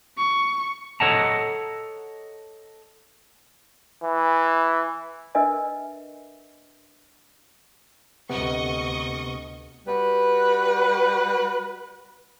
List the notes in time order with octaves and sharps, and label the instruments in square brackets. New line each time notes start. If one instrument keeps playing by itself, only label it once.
[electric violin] C#6
[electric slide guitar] A4 C#5 D#5 F#5 A5 A#5
[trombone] E3
[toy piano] D4 A#4 B4 D#5 E5 G#5
[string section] D2 D#5 C#6 [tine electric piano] C3 B3
[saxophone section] G3 F#4 B4